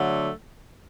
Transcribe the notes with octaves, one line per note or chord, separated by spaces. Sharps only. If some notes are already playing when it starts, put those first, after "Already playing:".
Already playing: D3 F#3 A3